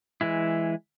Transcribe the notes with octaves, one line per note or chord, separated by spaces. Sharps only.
E3 G#3 E4